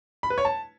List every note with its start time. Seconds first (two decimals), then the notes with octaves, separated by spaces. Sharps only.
0.23 B5
0.30 B4
0.38 C#5
0.45 A5